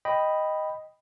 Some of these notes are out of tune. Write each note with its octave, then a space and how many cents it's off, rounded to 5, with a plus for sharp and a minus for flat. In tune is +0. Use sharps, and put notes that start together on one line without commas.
D#5 +0 G5 +0 B5 +0